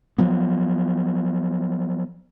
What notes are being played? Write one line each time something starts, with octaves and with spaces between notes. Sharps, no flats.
F3 F#3 B3